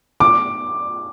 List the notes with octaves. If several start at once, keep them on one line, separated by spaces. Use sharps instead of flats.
D6